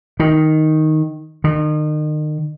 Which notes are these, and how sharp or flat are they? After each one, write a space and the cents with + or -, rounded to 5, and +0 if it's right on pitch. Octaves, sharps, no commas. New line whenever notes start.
D#3 +5
D#3 -35